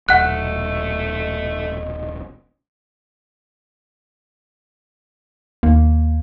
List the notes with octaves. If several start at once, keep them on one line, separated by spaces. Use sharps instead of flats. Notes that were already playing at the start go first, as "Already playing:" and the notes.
D#1 B1 A3 D#5 F#5 F#6
D#2 A#3